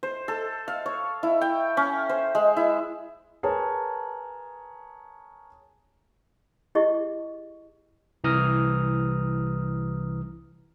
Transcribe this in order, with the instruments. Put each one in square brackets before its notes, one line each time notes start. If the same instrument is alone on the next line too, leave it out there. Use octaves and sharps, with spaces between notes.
[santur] C5
A4
F5
C#5
E4
G5
C#4
C5
G#3
E4
[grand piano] G#4 A#4 B4 C#5 A5
[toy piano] E4 G4 G#4 D#5 C#6
[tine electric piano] C2 E3 A#5 D#6 F6